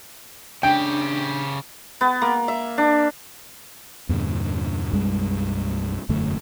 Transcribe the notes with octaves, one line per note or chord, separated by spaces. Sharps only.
C#3 D4 G4 G5
B3
A#3
E5
D4
E2 G2 A#2 D3
B1 F#2 G3 G#3
E1 F#2 D3 A3